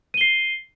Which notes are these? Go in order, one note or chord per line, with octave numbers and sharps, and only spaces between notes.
C7 D#7 G7